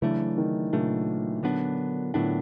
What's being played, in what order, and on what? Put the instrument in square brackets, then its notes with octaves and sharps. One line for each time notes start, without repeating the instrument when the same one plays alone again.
[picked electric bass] C#3 F#3 A3 D4 [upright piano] E3
[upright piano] D#3
[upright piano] A#2 [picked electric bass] C#3 F#3 A3 D4
[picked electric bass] D3 F#3 B3 D4
[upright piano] A2 [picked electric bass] D3 F#3 B3 D4